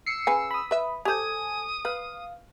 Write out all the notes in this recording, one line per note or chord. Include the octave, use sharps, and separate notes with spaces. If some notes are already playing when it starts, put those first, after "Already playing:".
E6 C7 C#7
C#3 B4 G#5
B5 D#6
B4 E5
G4 A4 C5 G#5 D#6
B4 F5